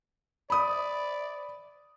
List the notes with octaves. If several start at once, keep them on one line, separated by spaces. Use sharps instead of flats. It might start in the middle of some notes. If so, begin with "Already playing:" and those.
D5 B5 D#6